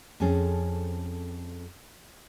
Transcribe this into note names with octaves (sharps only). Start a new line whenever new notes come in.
F2 C4 C#4 G#4 A4